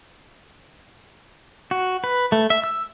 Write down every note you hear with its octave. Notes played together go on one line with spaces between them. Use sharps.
F#4
B4
A3
E5
E6